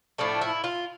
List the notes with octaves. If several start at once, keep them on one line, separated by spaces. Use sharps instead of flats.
A2 F3 A3 D4
E4
F4